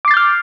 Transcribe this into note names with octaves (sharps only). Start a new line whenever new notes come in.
D6 F6 G6 A6 C7